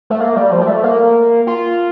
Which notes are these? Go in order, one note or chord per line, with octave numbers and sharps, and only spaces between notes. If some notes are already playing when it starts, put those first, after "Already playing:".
A3
A#3
G3
F3
G3
A3
A#3
F4